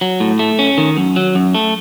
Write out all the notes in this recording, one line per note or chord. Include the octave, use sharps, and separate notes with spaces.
F#3
A2
A3
C#4
D#3
F#2
F#3
F#2
A3